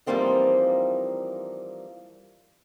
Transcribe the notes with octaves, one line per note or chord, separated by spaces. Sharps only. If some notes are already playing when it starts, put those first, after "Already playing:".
E3 F3 G3 A#3 C4 D#4